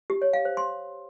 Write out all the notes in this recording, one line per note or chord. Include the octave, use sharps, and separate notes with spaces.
G4
C#5
F5
C5
C6